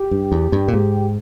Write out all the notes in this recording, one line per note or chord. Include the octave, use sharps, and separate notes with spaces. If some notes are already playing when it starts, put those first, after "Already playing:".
Already playing: G4
G2
E2
G2
A#2
G#2